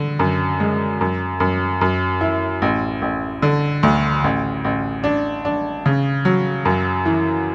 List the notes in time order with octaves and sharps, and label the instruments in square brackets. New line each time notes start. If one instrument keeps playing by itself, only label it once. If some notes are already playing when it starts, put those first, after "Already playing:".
Already playing: [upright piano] D3
F#2
G#3
F#2
F#2
F#2
E4
A1
A1
D3
D2
A1
A1
D4
D4
C#3
F#3
F#2
E3